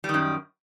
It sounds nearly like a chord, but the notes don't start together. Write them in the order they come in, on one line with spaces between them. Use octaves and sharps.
G3 D#3 F#2